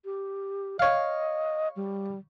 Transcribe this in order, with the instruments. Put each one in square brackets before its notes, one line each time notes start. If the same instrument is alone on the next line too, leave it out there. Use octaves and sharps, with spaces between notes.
[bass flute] G4
[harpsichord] C#5 F5 [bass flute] D#5
[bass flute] G3